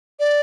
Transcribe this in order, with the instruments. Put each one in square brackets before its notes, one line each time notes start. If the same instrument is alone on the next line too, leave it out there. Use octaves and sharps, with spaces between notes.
[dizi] D5